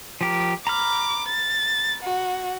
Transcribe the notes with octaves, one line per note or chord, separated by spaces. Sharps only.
F3 G4 A#4
A#5 B5 D6 F6
A6
F#4